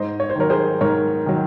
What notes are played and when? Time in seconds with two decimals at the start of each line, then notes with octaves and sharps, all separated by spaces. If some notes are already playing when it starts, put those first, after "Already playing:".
Already playing: G#2 C5 D#5
0.20 C#5
0.30 C5
0.35 D#3 F#3 A#4 C#5
0.50 G#4 C5
0.81 G#2 A#4 C#5
1.26 D#3 F#3